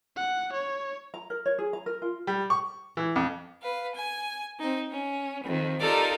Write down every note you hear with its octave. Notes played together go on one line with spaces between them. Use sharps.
F#5
C#5
A#5
A#4
C#5
G#4
A#5
A#4
F4
G3
C#6
E3
F2
B4 F5
G#5
C4 D#4
C#4
F2 D#3
D#4 F4 G4 A4 A#4 D5